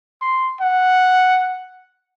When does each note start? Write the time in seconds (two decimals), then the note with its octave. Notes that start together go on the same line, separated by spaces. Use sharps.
0.22 C6
0.61 F#5